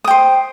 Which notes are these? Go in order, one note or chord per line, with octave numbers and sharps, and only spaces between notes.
C5 G5 D#6